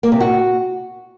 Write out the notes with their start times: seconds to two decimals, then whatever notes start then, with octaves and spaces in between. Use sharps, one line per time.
0.03 A#3
0.12 C3
0.20 F#4